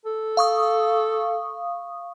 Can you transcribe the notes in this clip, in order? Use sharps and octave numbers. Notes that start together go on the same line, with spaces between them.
A4
F5 C#6 D#6